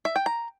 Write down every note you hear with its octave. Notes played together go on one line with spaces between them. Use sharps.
E5
G5
A#5